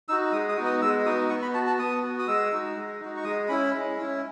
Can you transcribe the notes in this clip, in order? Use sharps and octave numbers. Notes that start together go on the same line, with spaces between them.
D#4 F#4 E6
G#3 D#6
D#6
B3 D#4 F#4
D#6
G#3 E6
B3 D#4 F#4 D#6
B3 C#6
B5
F#4 A5
A5
B3 D#6
F#4
D#6
G#3 E6
D#4 F#4
G#3
D#4 F#4
C#6
G#3 D#6
C#4 E4 B5
G#3
C#4 E4